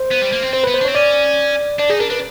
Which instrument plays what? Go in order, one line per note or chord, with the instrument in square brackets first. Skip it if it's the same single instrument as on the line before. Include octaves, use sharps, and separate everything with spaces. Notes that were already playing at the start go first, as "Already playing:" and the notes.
Already playing: [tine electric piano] C5
[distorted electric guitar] B3
G3
A#3
C4
[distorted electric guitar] C4 [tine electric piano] C5
[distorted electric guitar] B3 [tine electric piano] B4
[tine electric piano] C5
[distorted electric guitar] D4
[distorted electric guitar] C4 [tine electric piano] C#5
[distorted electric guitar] C#4 [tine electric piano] D5
[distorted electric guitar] D4 [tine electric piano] D5
[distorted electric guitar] D#4 [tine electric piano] G#4
[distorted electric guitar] D4 [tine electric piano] A#4
[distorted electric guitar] D4 [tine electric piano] B4